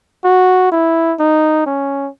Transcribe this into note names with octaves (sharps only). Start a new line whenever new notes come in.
F#4
E4
D#4
C#4